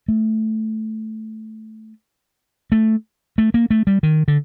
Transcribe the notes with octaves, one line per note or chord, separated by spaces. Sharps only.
A3
A3
A3
A#3
A3
G3
D#3
D3